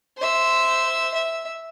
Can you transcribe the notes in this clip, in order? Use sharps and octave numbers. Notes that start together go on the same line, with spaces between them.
C5 E5
E5